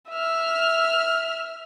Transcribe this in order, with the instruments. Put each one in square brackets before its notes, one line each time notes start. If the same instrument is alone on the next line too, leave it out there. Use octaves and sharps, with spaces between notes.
[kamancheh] E5 F6